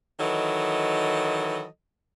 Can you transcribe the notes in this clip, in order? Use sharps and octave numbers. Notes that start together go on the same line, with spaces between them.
D#3 E3 F#3 A4 D#5